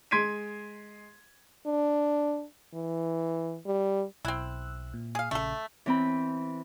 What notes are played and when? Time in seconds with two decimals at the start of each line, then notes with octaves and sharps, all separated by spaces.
0.11 G#3 C6 G#6 B6 D7 D#7
1.66 D4
2.74 E3
3.66 G3
4.25 B1 C4 E4 E6 F#6
4.93 A#2
5.15 G#4 F5
5.31 A#1 C#3 A3 A4
5.86 E3 C4 B5